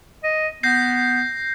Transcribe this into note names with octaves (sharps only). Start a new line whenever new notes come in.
D#5
B3 G6 A#6 C7